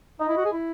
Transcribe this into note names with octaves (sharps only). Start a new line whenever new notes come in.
D#4 D#5
E4
F#4
G#4
E4